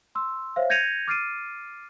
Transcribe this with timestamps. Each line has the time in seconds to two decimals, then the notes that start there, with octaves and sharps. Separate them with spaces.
0.15 C6 E6
0.56 C5 C#5 E5 F5
0.70 G6 G#6 A#6 C#7 D#7 F7
1.08 D6 F6 A6 C7 D7 D#7